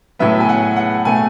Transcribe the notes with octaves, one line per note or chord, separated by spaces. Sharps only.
A2 F#3 B3 E5
G#5
F#5
F#5
B2 A3 G#5